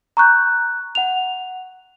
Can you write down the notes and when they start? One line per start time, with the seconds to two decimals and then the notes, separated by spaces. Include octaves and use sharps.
0.17 A#5 C#6 F#6 G6
0.95 F#5 F7